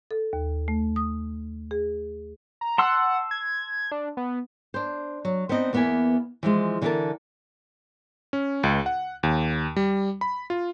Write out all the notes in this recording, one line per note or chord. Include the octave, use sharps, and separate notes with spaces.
A4
D#2
A3
D#6
G#4
A#5
F#5 A5 C6 E6
G#6
D4
B3
D4 C5
F#3
B3 C4 D4 D#4 D#5
E2 A#3 B3 C5 E5 G#5
E3 F3 G#3
D3 E3 F#4 A4 A#4 A5
C#4
C#2
F#5
D#2
G3
B5
F4